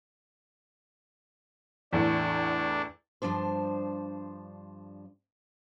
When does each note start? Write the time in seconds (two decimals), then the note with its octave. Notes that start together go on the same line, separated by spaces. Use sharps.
1.93 E2 A2 D4
3.22 G2 E3 F3 D4 C5